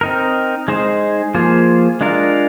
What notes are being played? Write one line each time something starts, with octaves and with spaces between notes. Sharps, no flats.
C4 D#4 A#4
G#3 D#4 G#4 C5
F3 A#3 F4 G#4 C5
G#3 D4 F4 A#4